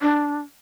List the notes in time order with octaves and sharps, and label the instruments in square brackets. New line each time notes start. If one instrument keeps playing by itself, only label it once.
[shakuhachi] D4